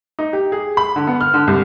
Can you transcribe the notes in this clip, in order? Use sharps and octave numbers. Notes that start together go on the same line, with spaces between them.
D#4
G4
G#4
B5
D3
B3
F6
D3
C2